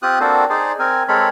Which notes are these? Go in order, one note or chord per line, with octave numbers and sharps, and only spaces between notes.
C4 F4 G4 D#6 F#6
A#3 C4 D4 F#4 A4 C5
D#4 G#4 C5 D5
C4 A#4 G#5
G#3 C4 A4 A#4 C#5 B5